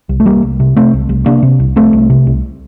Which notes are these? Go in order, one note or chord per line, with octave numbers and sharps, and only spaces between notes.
C2
A3
C2 G3 A#3
C2
C3
C3 A3 C4
C2
C2
C3 A#3 D4
C3
C2
C2 A3 C4
C2
C3
C2